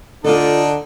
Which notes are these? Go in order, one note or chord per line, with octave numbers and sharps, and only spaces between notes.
D3 D4 D#4 F4 A4